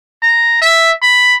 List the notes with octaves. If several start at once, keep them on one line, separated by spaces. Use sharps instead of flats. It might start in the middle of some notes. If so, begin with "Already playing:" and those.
A#5
E5
B5